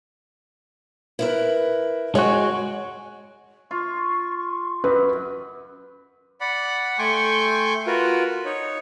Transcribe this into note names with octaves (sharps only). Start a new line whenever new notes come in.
E4 A#4 B4
G#3 F#4 C#5 G5 G#5
F4 C#6
F#2 B4
D5 F#5 B5
A3 G5 G#5 C6 C#6 G6
F4 F#4 A#4 B4
D#4 C#5